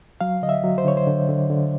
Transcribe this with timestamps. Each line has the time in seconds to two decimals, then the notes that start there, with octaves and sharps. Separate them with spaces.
0.21 F#3 F5
0.42 D3 D#5
0.49 E5
0.64 F#3
0.78 C5
0.85 D3 C#5
0.97 C5
1.07 D3
1.29 D3
1.50 D3